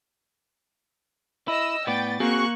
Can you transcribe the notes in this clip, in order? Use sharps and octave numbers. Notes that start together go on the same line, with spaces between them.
E4 D#5 E6
A2 B3 D5 G5 A6
A#3 C4 F#4 G#4 C#6 F#6